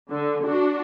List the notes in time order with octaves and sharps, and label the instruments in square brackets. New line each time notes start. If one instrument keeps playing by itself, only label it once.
[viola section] D3
D4 F#4